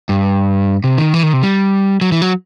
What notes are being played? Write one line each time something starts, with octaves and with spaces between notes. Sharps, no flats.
G2
C3
D#3
E3
D#3
C3
G3
F#3
E3
F#3